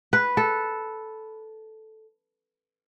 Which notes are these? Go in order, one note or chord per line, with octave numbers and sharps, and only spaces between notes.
B4
A4